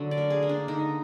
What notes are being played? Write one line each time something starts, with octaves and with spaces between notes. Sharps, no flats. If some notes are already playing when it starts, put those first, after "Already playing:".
Already playing: D3 F#3
D5
A#3
G#4
A#3
D4
D3 D#4